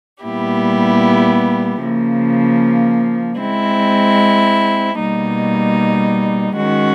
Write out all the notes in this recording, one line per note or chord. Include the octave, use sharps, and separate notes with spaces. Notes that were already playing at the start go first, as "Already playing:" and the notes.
A#2 G3 B3 E4 G4
C#3 F3 A#3
G#3 C4 E4
B2 G3 A#3 D#4
D#3 G#3 C#4 F#4